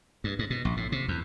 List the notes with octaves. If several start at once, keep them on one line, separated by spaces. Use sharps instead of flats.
G2
G#2
B2
A#1
A2
C3
E2